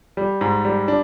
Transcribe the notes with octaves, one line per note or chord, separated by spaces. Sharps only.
G3
G#2
G3
D4